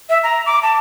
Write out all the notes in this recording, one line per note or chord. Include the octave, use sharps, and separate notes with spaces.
E5
A#5
D6
A5